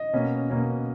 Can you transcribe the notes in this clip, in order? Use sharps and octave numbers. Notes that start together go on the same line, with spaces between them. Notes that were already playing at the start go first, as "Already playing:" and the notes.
Already playing: D#5
B2 A#3 C#4
B2 A#3 C#4